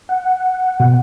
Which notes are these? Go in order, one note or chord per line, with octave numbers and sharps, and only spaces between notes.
F#5
B2